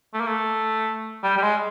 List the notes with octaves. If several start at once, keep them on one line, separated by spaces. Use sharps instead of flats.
A3
A#3
A3
G3
G3
G#3